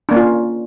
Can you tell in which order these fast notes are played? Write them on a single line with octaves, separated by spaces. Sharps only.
D4 A#3 C#4 F4